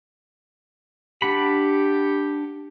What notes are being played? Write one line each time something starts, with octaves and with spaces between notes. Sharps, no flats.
D4 G4 F#5 B5